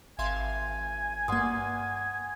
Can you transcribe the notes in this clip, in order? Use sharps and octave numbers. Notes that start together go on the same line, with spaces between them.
G#1 E5 F5 G#5 C6
G2 A#3 F#5 C6 D#6